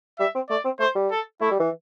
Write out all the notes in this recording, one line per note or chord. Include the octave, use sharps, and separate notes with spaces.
G3 E5
C4
A3 D5
C4
A3 C5
G3
A4
A3 E4
G3
E3